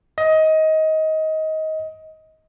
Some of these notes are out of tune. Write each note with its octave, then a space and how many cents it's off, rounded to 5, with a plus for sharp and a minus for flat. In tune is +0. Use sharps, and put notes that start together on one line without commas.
D#5 +20